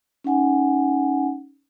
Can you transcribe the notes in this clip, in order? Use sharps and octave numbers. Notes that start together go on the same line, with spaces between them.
C#4 D#4 F#5 G#5